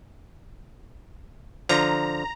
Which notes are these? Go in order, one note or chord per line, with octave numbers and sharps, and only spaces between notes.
D3 F3 A#5